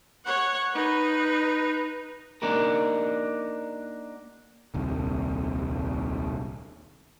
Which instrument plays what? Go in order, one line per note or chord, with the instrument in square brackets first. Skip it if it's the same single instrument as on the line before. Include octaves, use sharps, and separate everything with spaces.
[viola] C#5 F#5
D#4 B4
[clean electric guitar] A#3 D4 D#4 F#4 A#4
[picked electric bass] D#1 C2